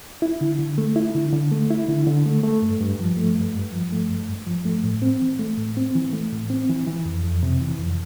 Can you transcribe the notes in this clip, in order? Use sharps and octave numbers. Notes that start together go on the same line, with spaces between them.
E4
D3
D3
A3
E4
D3
D3
A3
E4
D3
D3
A3
A3
G2
G2
F3
A3
G2
G2
F3
A3
G2
G2
F3
A3
A2
C4
E3
A3
A2
C4
E3
A3
A2
C4
E3
E3
F2
F2
C3
E3
F2